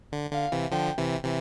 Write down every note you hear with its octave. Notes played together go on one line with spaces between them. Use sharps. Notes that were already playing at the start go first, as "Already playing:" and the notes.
D3
D3 F5
C3 E3
D3 F3 G5
C3 E3
C3 E3